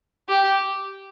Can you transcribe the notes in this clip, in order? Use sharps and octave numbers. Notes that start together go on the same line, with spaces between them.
G4